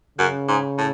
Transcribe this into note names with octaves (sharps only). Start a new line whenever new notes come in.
F#2 C#3
G#2
A2